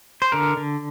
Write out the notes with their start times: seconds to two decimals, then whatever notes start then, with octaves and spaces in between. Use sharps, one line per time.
0.22 C5
0.32 D3 A#4
0.57 D3